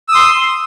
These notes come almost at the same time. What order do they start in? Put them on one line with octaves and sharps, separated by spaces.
E6 D#6 C6